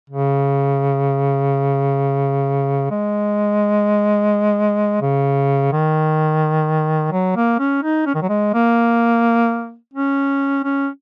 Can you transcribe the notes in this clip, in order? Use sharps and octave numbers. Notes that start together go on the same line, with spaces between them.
C#3
G#3
C#3
D#3
F#3
A#3
C#4
D#4
C#4
D#3
F#3
G#3
A#3
C#4
C#4